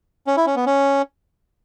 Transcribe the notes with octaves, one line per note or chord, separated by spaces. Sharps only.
C#4
E4
C#4
B3
C#4